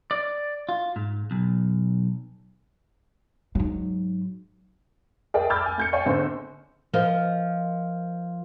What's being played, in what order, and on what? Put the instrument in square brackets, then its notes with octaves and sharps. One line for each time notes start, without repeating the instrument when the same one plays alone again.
[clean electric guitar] D5
F4
G#2
B1
[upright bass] G#2 F#3
[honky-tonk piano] G#4 A#4 D5 E5 G5
B5 D6 E6 F6 G6 A6
G#5
A3 G6 C#7
C#5 D5 F5 G5 G#5
G#1 E2 D3 C#4 C5
[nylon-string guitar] F3 A#4 D#5